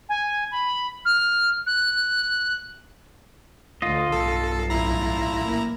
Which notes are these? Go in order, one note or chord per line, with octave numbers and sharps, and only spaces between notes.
G#5
B5
F6
F#6
D2 D3 F4 D#5
B1 G2 A4
A1 E4 A#5
A#3